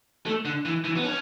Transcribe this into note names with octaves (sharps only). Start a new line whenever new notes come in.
A3
D3
E3
E3
B3
C#4